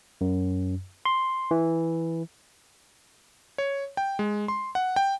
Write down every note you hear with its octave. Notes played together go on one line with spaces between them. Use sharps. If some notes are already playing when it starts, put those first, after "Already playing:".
F#2
C6
E3
C#5
G5
G#3
C6
F#5
G5